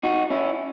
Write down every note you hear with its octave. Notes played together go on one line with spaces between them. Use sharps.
D#4 F#4
C#4 E4